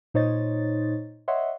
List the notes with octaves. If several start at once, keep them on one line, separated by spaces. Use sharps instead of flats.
A#2 D#4 C5 C#5 D#5 A6
C#5 D#5 E5 F#5 C6